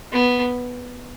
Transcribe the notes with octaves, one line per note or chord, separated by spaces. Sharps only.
B3